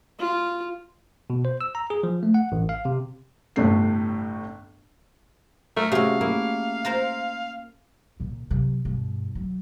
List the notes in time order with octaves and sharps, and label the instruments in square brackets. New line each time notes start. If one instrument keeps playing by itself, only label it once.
[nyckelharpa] F4
[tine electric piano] B2
C5
E6
A#5
G#4
F3
A3
F#5
A1
F5
C3
[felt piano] G1 A2 C3 A3 C7
[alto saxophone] A3 [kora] A#3 A#4
[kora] C3 F#4 G#4 [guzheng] A3 C#4 [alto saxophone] F5
[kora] A#3 [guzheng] E4
[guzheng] F4 A#4 C5
[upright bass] A#2 C#3
C3 F#3
G2 B2
F#3